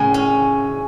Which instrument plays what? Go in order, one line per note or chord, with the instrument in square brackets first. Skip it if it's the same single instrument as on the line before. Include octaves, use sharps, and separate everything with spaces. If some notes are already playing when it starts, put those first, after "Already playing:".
Already playing: [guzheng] A2 C#3 [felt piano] G#5
[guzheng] C#4